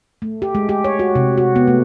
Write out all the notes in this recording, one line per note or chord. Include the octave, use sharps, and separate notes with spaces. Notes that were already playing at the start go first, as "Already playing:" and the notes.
A3
G4
G#3
G4
C#5
F#4
C3
F#4
B3
A3